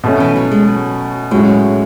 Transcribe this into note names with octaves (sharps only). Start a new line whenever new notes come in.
B2 E3 A3 C#4
E3
F#3
G#3
F#3
A2 F#3 G#3 C#4 F#4